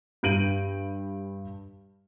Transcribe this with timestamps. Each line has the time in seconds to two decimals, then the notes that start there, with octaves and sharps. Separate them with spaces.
0.23 G2 G6 D7 D#7 F#7